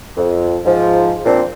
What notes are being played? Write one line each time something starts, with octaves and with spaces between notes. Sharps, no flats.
F2
G#2 F3
A#2 C4 D4